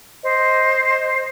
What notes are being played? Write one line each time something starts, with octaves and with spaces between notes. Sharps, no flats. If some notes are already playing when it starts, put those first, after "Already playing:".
C5 D#5